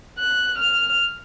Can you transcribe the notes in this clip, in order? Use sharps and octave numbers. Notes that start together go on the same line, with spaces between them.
F#6
F6